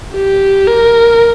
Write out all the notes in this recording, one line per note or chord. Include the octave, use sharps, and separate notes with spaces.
G4
A#4